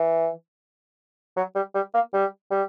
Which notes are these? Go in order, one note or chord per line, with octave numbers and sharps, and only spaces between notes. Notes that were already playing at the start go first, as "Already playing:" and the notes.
Already playing: E3
F#3
G3
G3
A#3
G3
G3